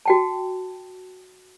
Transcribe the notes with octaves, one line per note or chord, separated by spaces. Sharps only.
F#4 G5 A5